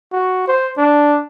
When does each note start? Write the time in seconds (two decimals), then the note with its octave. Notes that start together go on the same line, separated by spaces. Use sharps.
0.12 F#4
0.48 C5
0.78 D4